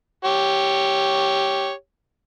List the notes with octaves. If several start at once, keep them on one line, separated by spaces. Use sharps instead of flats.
G4 C#5